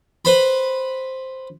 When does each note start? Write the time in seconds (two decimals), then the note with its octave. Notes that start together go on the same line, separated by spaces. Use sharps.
0.25 B4 C5 B5